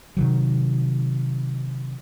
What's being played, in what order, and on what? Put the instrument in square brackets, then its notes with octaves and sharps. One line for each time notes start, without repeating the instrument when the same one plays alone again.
[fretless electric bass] C3 D#3 F#3